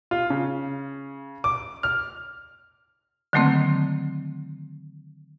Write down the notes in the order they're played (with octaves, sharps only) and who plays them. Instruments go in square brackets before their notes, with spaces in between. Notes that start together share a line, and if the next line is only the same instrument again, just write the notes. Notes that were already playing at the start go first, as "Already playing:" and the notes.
[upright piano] F4
C#3
D6
F6
[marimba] D3 D#3 F#3 A3 A#3 C4